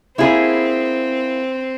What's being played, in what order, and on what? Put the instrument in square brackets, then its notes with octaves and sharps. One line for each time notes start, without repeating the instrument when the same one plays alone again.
[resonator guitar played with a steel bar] A#3 E4 G#4 [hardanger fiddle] C4